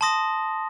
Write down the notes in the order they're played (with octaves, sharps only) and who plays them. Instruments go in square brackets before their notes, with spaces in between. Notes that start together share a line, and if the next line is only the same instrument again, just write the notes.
[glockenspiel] A5 C6 D#6 A#6